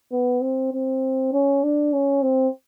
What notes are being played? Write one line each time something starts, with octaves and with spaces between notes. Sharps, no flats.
B3
C4
C4
C#4
D4
C#4
C4